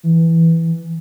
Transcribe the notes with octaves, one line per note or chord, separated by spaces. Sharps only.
E3